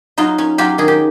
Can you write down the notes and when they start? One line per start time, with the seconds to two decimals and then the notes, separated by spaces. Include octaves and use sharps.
0.18 F#3 D#4 F4
0.38 C#4
0.58 F#3 F4 G4
0.78 D#3 G#4
0.88 G4